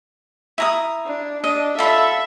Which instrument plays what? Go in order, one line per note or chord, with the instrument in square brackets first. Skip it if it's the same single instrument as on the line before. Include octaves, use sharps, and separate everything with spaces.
[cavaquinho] E4 A#5 D#6
[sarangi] D4
[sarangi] D4 [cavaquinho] D#5
[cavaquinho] F4 B5 [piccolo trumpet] A4 [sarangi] E5